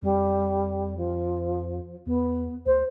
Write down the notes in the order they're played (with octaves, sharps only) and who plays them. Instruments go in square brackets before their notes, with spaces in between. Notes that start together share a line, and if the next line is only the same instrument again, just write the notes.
[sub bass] F2 [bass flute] G3
[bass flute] F3
[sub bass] E2 [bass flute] B3
[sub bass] D2 [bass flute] C5